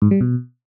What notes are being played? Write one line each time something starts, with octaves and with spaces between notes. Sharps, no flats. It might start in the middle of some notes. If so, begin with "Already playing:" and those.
G#2
G3
B2